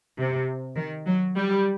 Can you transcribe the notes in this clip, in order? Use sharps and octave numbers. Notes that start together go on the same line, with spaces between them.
C3
D#3
F#3
G3